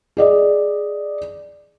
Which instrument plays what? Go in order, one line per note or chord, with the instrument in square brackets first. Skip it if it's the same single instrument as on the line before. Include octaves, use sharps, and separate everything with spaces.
[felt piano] G#4 D5 D#5